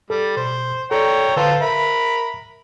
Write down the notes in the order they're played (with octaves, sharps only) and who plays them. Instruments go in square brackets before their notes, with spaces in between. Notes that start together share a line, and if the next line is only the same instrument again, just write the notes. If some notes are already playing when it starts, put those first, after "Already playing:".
[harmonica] G3 [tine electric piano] A4
[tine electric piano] B2 [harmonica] C5
[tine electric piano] A4 D5 [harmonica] C#5 G5 A#5
[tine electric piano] D3 B4 [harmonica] F4 A4 C5
[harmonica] A#4 B5 [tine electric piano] E5